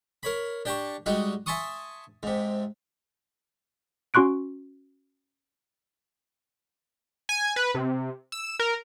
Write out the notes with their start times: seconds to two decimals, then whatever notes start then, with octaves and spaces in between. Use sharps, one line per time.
0.23 A#4 C#5 B5
0.65 D4 G4 G5 A5 A#5 C#6
1.06 G3 G#3 D#4 F#4
1.46 E5 G#5 A5 C6 C#6 D#6
2.23 G#2 C3
4.14 C#4 F#4 C6 C#6 F#6 D7
7.29 G#5
7.56 B4
7.75 C3
8.32 E6
8.59 A#4